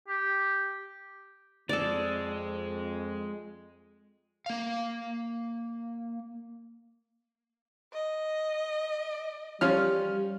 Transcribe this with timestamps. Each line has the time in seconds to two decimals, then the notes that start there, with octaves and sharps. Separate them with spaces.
0.08 G4
1.69 F2 G#3 A4 D5
4.46 A#3 F5
7.93 D#5
9.61 F3 G3 C#4 F6